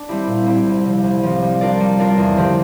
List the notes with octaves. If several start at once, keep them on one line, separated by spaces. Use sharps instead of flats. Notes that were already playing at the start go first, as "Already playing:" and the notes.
Already playing: D4
G3 C4 E4 G4
A#2
G3 C4 E4 G4
C2
C3 F3
C2
C3 F3
G3
D4 F4 A#4 D5
G3
D4 F4 A#4 D5
E2
D3 F3 C4 G4